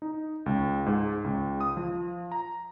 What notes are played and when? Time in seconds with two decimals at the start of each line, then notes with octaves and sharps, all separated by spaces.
0.02 D#4
0.46 C#2
0.86 G#2
1.24 C#2
1.61 D#6
1.77 F3
2.32 A#5